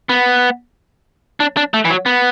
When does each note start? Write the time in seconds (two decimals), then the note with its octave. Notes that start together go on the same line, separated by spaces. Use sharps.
0.09 B3
1.40 D4
1.57 D4
1.74 A3
1.85 E3
1.90 F#3
2.06 B3